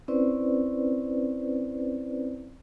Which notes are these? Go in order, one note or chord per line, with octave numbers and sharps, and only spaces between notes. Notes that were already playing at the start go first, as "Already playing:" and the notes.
C4 C#4 E4 B4 C5 D5